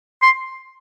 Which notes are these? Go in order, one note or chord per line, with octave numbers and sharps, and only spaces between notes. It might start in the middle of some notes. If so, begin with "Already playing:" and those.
C6